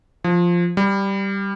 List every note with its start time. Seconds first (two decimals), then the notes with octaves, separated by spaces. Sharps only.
0.24 F3
0.77 G3